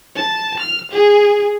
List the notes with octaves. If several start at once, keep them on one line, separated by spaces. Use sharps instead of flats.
A5
F6
G#4